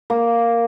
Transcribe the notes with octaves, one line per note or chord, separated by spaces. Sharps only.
A#3